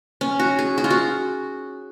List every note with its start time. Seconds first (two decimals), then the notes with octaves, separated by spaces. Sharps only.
0.21 C#4
0.39 F#4
0.59 G#4
0.78 F#4
0.84 F4
0.90 F#4